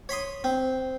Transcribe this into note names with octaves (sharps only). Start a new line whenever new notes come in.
C#5 B5 C6 D#6
C4